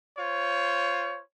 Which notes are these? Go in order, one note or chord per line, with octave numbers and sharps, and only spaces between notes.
F4 C5 C#5